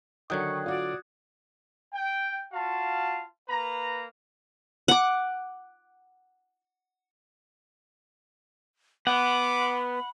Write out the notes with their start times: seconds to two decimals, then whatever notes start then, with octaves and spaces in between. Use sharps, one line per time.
0.30 D3 D#3 F#3 G5 C#6 D#6 F#6 G#6
0.66 F4 F#4 D5
1.93 G5
2.53 F4 F#4 F5 A5
3.48 A#3 B4 A#5
4.88 F#5 D6
9.07 B3 F#5 B5 D6